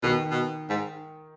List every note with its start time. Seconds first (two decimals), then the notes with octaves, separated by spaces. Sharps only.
0.03 B2 D#3
0.31 B2
0.70 G#2